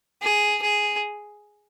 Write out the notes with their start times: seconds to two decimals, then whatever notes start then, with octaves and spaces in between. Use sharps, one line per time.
0.22 G#4
0.62 G#4